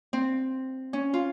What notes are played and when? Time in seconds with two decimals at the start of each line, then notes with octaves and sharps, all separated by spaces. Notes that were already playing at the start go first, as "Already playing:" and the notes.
0.13 C4
0.93 C#4
1.14 F4